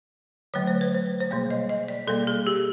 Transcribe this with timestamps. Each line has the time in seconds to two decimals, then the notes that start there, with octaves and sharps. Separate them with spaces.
0.54 D3 F#3 A3 C#5
0.67 C5
0.81 B4
0.95 C5
1.20 C5
1.31 B2 G3 A#3 C#5
1.51 D#5
1.70 D#5
1.88 D5
2.08 B2 G3 A#3 A4
2.27 G#4
2.47 G4